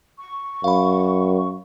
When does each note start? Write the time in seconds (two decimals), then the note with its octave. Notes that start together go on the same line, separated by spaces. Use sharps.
0.19 C#6
0.64 F#2 F5 B5